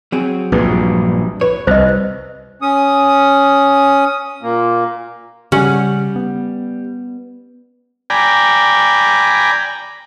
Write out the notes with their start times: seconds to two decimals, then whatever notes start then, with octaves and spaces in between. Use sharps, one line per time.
0.12 F#3 C4 G#4
0.52 A#1 G2 B4
1.41 B4 C#5
1.67 C2 C5 D#5
2.62 C#4 D#6
4.43 A#2 A#3
5.52 C#3 G3 C#4 F#5
6.16 B3
8.10 D5 G5 G#5 A#5 B5